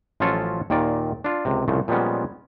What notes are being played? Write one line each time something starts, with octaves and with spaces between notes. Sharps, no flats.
A1 F3 F#3 C#4 F4 A4
D#2 A#2 D#3 F4 D5
D4 F4
C#2 C3
C2 C#3 F3 A3
A#2 F3 G3 G#3 B3 C#4